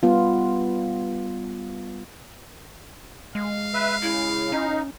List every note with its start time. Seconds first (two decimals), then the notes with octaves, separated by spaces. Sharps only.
0.03 G3 B3 F4
3.35 G#3 F5
3.74 B4 E5
4.02 C#3 E4
4.52 C#4 D#4